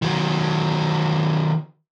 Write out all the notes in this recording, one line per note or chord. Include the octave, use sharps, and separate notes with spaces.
D#3 F#3